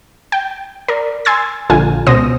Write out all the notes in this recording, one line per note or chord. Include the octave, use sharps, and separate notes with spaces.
G5
A#4 D5
G#5 C6 E6 G#6 A6
A#1 D3 F4 G#5
C#2 B2 C5 D#6 A#6